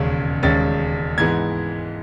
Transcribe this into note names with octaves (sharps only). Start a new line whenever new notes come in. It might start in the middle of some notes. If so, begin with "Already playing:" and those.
Already playing: E1 D#2 C#3 G#3 C#4
E1 D#2 C#3 G#3 C#4 A6
G#2 E3 G#3 B3 G#6